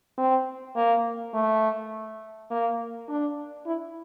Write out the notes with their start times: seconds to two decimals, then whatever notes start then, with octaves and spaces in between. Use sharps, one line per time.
0.18 C4
0.76 A#3
1.34 A3
2.50 A#3
3.09 D4
3.66 E4